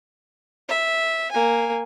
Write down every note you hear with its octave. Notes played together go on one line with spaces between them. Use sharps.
E5
A#3 G#5